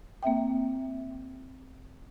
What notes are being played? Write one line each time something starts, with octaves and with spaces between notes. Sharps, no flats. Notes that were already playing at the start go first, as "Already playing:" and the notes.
A#3 C4 E5 G5